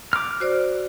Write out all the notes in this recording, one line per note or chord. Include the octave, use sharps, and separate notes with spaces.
D6 F6
F#4 C5 D5